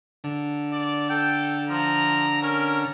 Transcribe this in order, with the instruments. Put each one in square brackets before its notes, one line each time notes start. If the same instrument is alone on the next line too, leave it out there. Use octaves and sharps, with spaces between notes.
[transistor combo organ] D3
[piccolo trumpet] D5
[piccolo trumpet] A4 [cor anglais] G5
[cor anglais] F3 [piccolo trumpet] A#5
[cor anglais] C#4 [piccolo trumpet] A#4